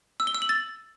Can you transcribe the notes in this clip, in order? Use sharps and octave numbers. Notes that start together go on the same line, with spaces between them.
E6
G7
E6
F#7
A6